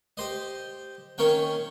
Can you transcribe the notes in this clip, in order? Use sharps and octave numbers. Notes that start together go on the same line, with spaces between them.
G4 C5 D#5
D#3 A#3 C#4 G5